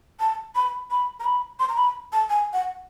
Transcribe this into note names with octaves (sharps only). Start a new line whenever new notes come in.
A5
B5
B5
A#5
B5
C6
A#5
B5
A5
G#5
F#5